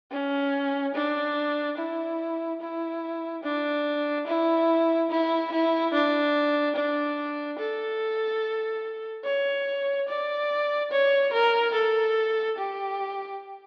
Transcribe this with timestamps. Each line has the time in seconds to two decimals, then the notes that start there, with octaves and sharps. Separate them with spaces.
0.11 C#4
0.94 D4
1.77 E4
2.61 E4
3.43 D4
4.26 E4
5.10 E4
5.52 E4
5.93 D4
6.75 D4
7.59 A4
9.25 C#5
10.08 D5
10.91 C#5
11.33 A#4
11.74 A4
12.58 G4